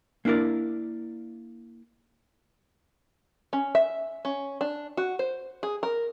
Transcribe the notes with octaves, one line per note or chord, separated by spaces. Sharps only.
A#3 D4 E4 A#4 D5
C#4
E5
C#4
D4
F#4
C5
G#4
A#4